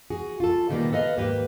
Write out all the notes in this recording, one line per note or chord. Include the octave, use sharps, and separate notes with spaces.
F#4 G#4
F4 A4
A#2 D#3 F#3 G3 A#3 B3
A4 B4 D#5 F5
D#2 G#2 A#3 G4 B4